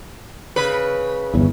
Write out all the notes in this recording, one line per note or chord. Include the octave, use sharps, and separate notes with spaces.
C#3 B4
G1 E2